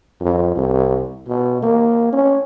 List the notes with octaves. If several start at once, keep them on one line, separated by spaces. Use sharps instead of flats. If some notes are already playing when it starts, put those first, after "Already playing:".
F2
C2
B2
A#3
C#4